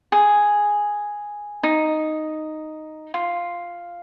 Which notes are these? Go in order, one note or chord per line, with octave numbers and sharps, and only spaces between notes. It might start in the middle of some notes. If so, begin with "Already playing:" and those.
G#4
D#4
F4